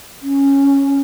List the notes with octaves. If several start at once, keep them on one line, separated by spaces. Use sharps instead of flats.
C#4